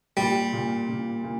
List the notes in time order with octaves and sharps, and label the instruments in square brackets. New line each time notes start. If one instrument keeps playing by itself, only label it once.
[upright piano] A#2 [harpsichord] G3
[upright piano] A#2
A#2
A#2